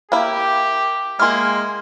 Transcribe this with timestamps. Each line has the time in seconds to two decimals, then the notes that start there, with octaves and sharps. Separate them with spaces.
0.12 A#3 E4 G4
1.19 G#3 A#3 E4 G#4 C6 F6